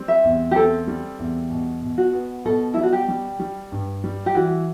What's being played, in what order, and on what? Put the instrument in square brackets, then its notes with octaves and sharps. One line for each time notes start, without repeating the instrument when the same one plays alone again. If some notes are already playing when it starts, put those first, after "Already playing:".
Already playing: [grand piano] G3 C4
[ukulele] E5
[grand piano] E2
[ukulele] G4
[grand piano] C4 [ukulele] A4
[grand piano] G3
E2
B2
B2
[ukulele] F#4
[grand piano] B3
[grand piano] B2 [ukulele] A4
[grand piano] G3 [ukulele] E4
[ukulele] F#4
G4
[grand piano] G3
G3
G2
G3
[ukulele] G4
[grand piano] E3 [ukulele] F#4